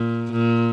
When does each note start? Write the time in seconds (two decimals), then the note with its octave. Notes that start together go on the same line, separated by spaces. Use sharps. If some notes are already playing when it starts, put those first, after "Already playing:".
Already playing: A#2
0.32 A#2